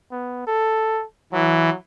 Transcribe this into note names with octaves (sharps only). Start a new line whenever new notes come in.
B3
A4
E3 F#3